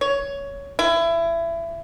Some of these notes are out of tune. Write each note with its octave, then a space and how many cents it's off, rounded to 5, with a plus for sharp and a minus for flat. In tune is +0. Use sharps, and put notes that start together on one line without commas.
C#5 +15
E4 +25